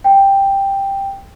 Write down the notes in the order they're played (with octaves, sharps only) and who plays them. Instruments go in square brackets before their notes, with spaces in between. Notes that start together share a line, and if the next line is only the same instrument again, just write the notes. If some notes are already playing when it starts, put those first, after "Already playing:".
[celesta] G5